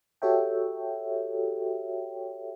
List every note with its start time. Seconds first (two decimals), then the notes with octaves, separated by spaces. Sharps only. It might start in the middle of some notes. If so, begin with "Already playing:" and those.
0.22 F#4 G4 A4 C#5 E5 G5